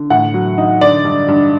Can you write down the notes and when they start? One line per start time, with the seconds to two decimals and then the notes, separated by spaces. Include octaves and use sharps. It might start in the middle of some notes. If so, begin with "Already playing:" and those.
Already playing: D3
0.10 A2 F#5
0.34 F#3
0.58 D#4
0.81 D3 D5
1.05 G2
1.28 G2